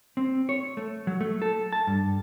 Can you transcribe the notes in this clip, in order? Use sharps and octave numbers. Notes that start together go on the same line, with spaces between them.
C4
C#5
A3
F#3
A3
A4
A5
G2